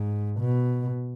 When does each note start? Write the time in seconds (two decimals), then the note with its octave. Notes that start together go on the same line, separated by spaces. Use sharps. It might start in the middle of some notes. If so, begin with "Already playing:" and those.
Already playing: G#2
0.40 B2